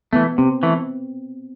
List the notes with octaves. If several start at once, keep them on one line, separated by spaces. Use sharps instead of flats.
E3 A3 B3
C3 C4
E3 A3